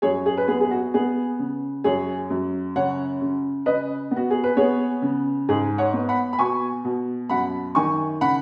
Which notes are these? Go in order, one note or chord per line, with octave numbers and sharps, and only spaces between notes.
F#2 G#4 C#5
G#4
B4
B3 G#4
G#4
F#4
B3 G#4
C#3
F#2 G#4 C#5
F#2
C#3 C#5 F#5
C#3
C#3 B4 D#5
B3
F#4
G#4
B4
B3 G#4 C#5
C#3
G#2 G#4
C#5 F#5
B3
F#5 B5
B5
B2 G#5 C#6
B2
F#2 F#5 B5
D#3 G#5 C#6
C#3 F#5 B5